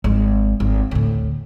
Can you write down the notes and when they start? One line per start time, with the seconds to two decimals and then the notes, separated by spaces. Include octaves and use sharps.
0.04 G#1 G#3
0.60 G#1
0.91 D2 A2